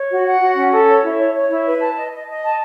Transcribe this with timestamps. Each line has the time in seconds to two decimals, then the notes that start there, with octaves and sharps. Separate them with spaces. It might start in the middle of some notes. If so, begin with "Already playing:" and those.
Already playing: C#5
0.10 F#4
0.26 F#5
0.40 F#4
0.56 C#4
0.71 A4
0.87 C#5
1.04 E4
1.18 C#5
1.34 C#5
1.50 E4
1.66 B4
1.81 A5
1.96 D#5
2.13 D#5
2.27 D#5
2.44 A5